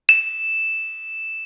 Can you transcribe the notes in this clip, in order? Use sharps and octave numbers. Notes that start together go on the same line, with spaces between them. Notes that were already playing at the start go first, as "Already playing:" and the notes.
E7